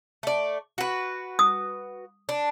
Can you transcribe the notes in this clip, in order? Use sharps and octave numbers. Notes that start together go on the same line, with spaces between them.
A3 D5
F#4 B4
D#6
D4